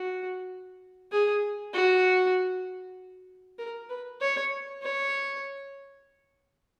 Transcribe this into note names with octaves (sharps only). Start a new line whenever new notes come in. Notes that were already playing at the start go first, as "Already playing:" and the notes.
Already playing: F#4
G#4
F#4
A#4
B4
C#5
C#5